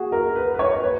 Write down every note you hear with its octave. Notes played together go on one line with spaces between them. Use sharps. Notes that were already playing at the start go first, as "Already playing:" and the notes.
Already playing: F#4 G#4
A#4
B4
B4
C#5
B4